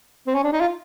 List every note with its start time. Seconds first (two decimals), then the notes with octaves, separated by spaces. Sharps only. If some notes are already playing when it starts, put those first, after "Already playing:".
0.27 C4
0.35 C#4
0.44 D4
0.53 D#4
0.61 F4